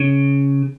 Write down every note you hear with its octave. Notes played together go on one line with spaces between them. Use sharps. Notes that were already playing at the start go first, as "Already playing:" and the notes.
Already playing: C#3